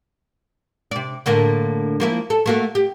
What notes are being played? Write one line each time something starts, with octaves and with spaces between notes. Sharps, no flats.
C3 D5
A2 D3 A#3
F3 A#3 E4
A4
A3 A#3 F#4
G4